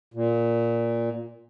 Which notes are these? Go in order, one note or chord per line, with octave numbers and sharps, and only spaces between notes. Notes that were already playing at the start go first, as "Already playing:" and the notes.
A#2